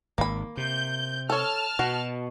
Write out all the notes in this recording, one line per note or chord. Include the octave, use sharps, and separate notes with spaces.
G#1 A#3 B5
C3 G6
A4 C#5 A5 F6
B2 F#4